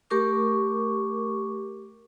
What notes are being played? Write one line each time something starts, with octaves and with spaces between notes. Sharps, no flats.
A3 G4 A#4 C#6 D6